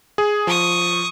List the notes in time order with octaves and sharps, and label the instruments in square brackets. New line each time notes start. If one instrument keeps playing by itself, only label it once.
[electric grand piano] G#4
[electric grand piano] F3 [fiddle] C#6 D#6